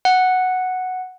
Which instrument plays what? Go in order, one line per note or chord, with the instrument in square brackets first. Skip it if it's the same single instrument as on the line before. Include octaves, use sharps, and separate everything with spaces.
[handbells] F#5